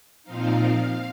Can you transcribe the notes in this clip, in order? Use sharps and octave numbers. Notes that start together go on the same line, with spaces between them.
A#2 F3 C4 D#4 F5